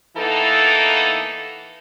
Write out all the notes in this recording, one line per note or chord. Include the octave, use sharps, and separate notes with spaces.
E3 A#3 B3 D#4 A4